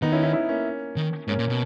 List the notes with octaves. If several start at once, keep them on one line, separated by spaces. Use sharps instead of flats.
D#3 B3 D#4
C#4 E4
C#4 E4
C#4 E4
A#3 C#4
D#3
G#2 A#3 C#4
A#2
B2